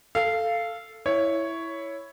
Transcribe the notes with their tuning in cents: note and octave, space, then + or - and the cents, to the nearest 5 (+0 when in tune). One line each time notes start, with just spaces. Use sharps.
A4 +0 F5 -15
E4 +0 C#5 +5